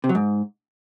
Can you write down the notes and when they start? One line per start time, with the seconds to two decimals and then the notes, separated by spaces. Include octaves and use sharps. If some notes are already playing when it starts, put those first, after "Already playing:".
0.04 C3
0.09 F#3
0.15 G#2